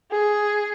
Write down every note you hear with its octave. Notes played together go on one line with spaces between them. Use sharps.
G#4